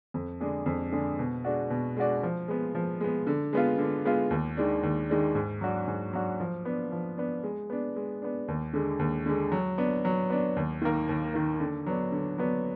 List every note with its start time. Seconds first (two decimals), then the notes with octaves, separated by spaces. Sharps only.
0.14 F2
0.41 D3 G#3 D4 G#4
0.66 F2
0.92 D3 G#3 D4 G#4
1.19 B2
1.44 G#3 D4 F#4 D5
1.70 B2
1.97 G#3 D4 F#4 D5
2.23 F3
2.48 G#3 B3
2.75 F3
3.01 G#3 B3
3.27 D3
3.53 G#3 B3 F4
3.78 D3
4.05 G#3 B3 F4
4.30 D#2
4.57 D#3 G#3 D4
4.83 D#2
5.09 D#3 G#3 D4
5.35 G#2
5.61 F#3 D4 F#4
5.88 G#2
6.13 F#3 D4 F#4
6.40 F3
6.65 B3 D4
6.92 F3
7.17 B3 D4
7.43 G#3
7.70 B3 D4
7.96 G#3
8.22 B3 D4
8.48 D#2
8.73 D3 G#3
8.99 D#2
9.26 D3 G#3
9.52 F#3
9.78 B3 D4
10.05 F#3
10.30 B3 D4
10.56 D#2
10.82 D#3 A#3
11.09 D#2
11.34 D#3 A#3
11.60 D3
11.86 F#3 B3 D4
12.12 D3
12.38 F#3 B3 D4